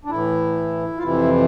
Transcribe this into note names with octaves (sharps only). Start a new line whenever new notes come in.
D4
A2 E3 E4
F4
F2 C3 E3 E4